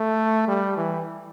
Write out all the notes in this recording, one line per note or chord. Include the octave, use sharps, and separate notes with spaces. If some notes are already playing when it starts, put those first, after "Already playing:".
Already playing: A3
G3
E3